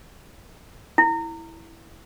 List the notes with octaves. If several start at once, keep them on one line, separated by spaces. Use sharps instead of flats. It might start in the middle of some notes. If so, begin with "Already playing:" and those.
E4